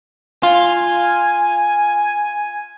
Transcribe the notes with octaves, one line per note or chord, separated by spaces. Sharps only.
F4 G#5